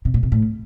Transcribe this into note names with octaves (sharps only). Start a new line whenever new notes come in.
C3
A#2
C3
A2